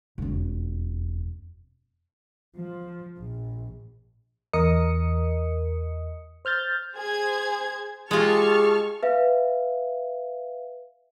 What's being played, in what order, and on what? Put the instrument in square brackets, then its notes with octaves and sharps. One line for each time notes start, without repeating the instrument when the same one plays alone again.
[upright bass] E1 F2
[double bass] F3
A#1
[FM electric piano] E2 A#4 D#5 D#6 C#7
C5 F6 G6 A6
[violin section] G#4 C5 G#6
[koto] G#3 F4 [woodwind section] G4 G#4 [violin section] A5 C#6 F6
[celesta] B4 E5 F5